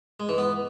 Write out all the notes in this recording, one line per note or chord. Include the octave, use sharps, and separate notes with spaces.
G#3
E3
B3